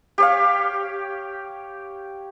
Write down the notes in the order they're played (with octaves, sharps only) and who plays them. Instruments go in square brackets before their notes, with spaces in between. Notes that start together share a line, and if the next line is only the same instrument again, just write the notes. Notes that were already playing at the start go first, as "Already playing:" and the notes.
[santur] G4 C#5 F5